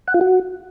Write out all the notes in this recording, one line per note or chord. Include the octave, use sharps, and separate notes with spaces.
F#5
F4
F#4